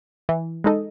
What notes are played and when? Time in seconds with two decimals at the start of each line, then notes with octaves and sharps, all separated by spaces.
0.29 E3
0.64 G#3 D#4 A4 D#5